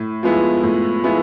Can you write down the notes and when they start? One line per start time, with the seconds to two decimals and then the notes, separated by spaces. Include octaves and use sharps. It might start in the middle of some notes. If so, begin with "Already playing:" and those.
Already playing: A2
0.23 F3 G#3 B3 E4
0.63 A2
1.04 F3 G#3 B3 E4